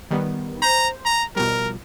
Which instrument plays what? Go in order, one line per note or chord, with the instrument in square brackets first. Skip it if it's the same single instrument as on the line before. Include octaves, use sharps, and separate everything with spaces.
[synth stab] D#3 G3 B3
[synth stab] C5 [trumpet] A#5
[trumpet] A#5
[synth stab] B2 F3 G3 [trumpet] A#4